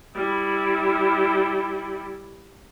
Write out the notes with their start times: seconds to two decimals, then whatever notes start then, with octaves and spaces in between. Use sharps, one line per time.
0.16 G3 E4